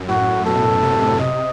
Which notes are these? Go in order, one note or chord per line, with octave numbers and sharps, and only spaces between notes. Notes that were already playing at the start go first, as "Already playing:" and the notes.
Already playing: F#2
A2 F#4
B2 A4
C3
C3 D#5